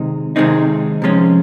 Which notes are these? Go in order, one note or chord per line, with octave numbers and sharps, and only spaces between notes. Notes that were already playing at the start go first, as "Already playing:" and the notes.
Already playing: C3 D#3 G#3 C4 D#4
C3 D#3 G#3 C4 D#4
C3 F3 G#3 C#4